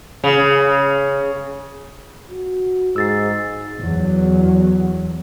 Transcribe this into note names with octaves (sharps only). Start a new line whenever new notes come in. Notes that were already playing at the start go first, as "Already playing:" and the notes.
C#3
F#4
G#2 G#4 E6 A6 C7
E2 F#3